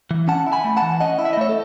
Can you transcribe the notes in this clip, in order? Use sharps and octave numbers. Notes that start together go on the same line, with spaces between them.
E3
C#4 F#5 A5
E4
G#5 B5
A3
F#5 A5
E3
C#4 D#5 F#5
E4
E5
D#5
A3 C#5 E5
A4